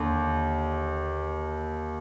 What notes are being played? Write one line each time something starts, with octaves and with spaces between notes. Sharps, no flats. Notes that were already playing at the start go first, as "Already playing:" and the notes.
Already playing: D#2 D3